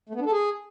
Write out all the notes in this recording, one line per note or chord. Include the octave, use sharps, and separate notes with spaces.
A3
B3
D4
A4
G#4